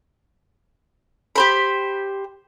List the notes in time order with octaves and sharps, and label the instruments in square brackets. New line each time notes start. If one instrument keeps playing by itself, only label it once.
[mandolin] G4 C5 B5